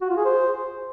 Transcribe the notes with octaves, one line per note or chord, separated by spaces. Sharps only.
F#4
F4
G#4
C5